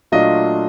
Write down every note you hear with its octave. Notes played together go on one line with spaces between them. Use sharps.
A#2 F#3 A3 D4 F4 D#5